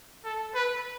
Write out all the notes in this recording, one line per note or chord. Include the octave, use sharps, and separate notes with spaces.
A4
B4